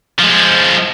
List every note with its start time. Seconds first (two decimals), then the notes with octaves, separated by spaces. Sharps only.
0.19 F3 G#3